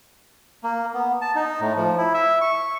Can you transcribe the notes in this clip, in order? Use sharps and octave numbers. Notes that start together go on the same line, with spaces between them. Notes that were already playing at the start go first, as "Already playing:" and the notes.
A#3
B3
A5
D#4
A2
F3
E4
E5
C#6